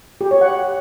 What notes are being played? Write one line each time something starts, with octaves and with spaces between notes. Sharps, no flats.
G4
C#5
F#5